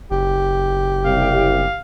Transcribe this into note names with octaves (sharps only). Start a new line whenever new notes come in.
F#1 G4
C2 F5